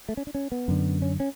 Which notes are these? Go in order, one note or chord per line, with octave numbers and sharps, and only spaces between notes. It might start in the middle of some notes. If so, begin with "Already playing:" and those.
A3
C#4
D4
C#4
B3
F#2 D3
C#4
C#4